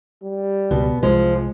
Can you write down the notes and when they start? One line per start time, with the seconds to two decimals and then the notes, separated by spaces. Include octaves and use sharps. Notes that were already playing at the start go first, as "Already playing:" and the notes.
0.22 G3
0.71 C#2 B2 B3
1.03 C2 F3 G#3